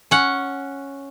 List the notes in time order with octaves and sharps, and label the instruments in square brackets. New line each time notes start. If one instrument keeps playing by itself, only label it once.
[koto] C#4 F#5